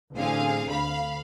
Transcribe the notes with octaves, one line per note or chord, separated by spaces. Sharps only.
A1 D3 C4 G#4 F5
D2 F5 B5